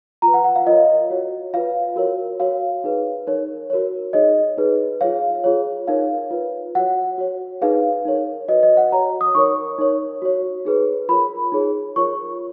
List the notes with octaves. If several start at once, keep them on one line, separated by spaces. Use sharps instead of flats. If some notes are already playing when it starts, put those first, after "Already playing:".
F4 A#5
B4
F#5
F#5
F5
F4 A#4 C#5 D#5
F#4 C#5
F4 B4 F5
F#4 A#4 C#5
F#4 C#5 F5
D#4 G#4 B4
D#4 A#4 C#5
F#4 A#4 C#5
D#4 G#4 C#5 D#5
D#4 G#4 B4
F4 G#4 C#5 F5
F4 G#4 C#5
D#4 A#4 C#5 F5
F4 B4
F#4 C#5 F#5
F#4 C#5
D#4 G#4 B4 F5
D#4 A#4 C#5
F#4 B4 D#5
D#5
F#5
F#4 C#5 A#5
D#6
D#4 A#4 C#5 C#6
D#4 A#4 C#5
F#4 C#5
D#4 G#4 B4
F4 A#4 C#5 B5
D#4 G#4 C#5
F4 A#4 C#5 C#6